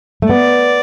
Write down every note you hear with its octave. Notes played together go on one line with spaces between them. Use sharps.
A3
B3 D5